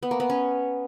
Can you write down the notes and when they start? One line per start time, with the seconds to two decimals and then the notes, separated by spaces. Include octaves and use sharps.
0.03 B3
0.11 A#3
0.20 B3
0.30 C#4